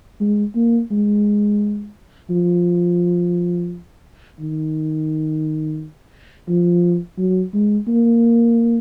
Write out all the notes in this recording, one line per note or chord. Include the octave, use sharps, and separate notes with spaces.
G#3
A#3
G#3
F3
D#3
F3
F#3
G#3
A#3